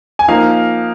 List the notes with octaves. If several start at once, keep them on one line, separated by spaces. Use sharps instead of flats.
G#5
F3 A#3 D#4 F5